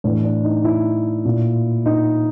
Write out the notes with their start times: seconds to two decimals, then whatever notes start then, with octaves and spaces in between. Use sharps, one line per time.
0.04 A2 E3 D4
0.24 D4
0.44 D#4
0.64 E4
1.25 A#2
1.86 D#4